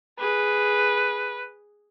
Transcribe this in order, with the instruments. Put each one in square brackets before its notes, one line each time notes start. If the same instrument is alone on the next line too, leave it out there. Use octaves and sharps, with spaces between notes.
[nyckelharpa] G#4 [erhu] B4